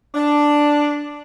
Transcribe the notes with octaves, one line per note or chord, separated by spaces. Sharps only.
D4